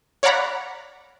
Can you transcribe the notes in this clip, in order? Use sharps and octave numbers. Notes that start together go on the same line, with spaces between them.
C#5 D5 F5 F#5 A#5 B5